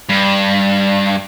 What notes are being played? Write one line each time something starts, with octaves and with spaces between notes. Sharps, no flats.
G2